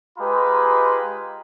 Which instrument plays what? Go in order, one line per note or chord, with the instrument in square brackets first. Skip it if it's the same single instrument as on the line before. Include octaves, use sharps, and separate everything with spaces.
[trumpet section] G#3 F4 G4 B4 A#5 B5